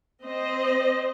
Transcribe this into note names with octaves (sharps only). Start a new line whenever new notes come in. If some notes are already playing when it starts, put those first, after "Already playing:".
C4 C5 D#5